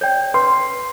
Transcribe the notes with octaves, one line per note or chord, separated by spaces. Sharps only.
C#5 D5 G5
B4 C6